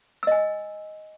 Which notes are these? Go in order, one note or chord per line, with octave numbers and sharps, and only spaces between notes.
D#5 G#5 E6